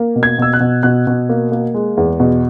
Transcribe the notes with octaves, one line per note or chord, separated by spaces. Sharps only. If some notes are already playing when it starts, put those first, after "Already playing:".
Already playing: A#3
B2
G#6
B2 E6
F#6
B2
B2 F#6
B2
A#3
A#3
G#3
E2
B2